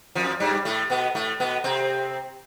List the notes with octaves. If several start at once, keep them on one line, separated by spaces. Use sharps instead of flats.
F2 F3
G2 G3
A2 A3
B2 B3
A2 A3
B2 B3
C3 C4